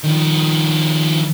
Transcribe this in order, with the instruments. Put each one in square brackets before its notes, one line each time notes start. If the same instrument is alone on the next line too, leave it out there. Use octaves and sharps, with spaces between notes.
[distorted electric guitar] D#3 F3